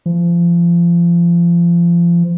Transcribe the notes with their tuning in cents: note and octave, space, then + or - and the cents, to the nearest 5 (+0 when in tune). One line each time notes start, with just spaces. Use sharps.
F3 -30